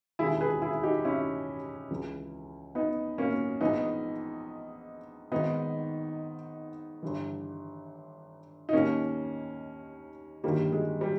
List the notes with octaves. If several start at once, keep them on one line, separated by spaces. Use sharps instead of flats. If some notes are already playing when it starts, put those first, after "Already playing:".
E1 D#2 C#3 E4 G#4
G#4 B4
E4 G#4
D#4 G4
C#4 E4
C#2 C#3 E3
B3 D#4
A#3 C#4
A#1 G#2 E3 B3 D#4
G#1 G#2 D#3 B3 D#4
G1 G2 E3
D#4
D#2 D#3 A#3 C#4
G1 G2 D#3 G3 A#3
G#3
G3